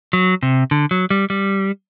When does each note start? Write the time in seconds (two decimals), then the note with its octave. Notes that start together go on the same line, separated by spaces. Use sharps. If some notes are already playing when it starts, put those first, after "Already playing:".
0.13 F#3
0.43 C3
0.71 D3
0.91 F#3
1.10 G3
1.30 G3